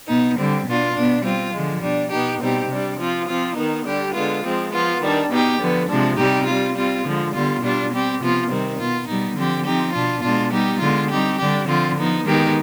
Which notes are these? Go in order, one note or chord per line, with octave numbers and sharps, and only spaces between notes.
B2 B3 D#4
D3 G3 C4
B2 B3 D4 F4
B2 B3 D4
G3 C4 F4
D3 F3 G#3
B2 G3 D4
B2 B3 D#4 G4
B2 G3 C4 D#4 G4
C3 G3 D4
F3 C4 F4
F3 C4 F4
D#3 B3 D#4
D3 G3 D4 G4
D3 G#3 B3 F4
F3 G#3 C4
F3 B3 F4
D#3 G3 D4
B2 B3 D#4 G4
D3 F3 B3
C3 F3 G#3 D4
C3 G3 C4 D#4 G4
G3 C4 F4
G3 C4 F4
D3 F3 G#3
D3 G3 B3 F4
B2 G3 D4 F4
G3 C4 G4
C3 F3 B3 F4
C3 D#3 G3 C4
B2 B3 F4
B2 G3 B3 D#4
D3 F3 C4 G4
F3 C4 D#4 G4
B2 B3 D4 F4
B2 G#3 D4 F4
G3 B3 D#4 G4
D3 G#3 B3 F4
G3 C4 D#4 G4
D3 G3 D4 G4
D3 F3 C4 F4
F3 B3 D#4
D#3 G#3 B3 D#4 G4